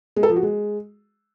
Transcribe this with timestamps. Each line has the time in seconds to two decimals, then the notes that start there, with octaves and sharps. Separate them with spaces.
0.16 G#3
0.23 A4
0.30 F3
0.36 F#4
0.43 G#3